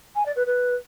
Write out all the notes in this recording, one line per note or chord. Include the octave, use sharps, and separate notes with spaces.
G#5
D5
B4
B4